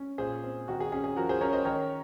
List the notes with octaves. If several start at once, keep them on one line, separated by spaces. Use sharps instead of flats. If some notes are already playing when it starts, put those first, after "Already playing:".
Already playing: C#4
A#2 G#4 C5
C4
D#3 F#4
G#4
C#4 G#4
G#4
F3 F#4 A#4
G#4 C5
C#4 A#4 C#5
C5 D#5
D#3 A#4 C#5